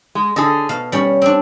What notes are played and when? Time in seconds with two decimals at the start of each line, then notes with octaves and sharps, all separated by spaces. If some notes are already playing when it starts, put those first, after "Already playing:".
0.15 G#3
0.36 D3 G#4 A4 D#5
0.69 B2 F5
0.92 G3 C#4
1.22 C4 D4